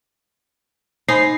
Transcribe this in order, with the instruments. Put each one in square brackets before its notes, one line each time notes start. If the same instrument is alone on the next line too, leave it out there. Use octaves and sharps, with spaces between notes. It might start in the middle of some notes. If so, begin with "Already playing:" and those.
[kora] D#4 [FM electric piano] C5 G#5 B5 [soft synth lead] C7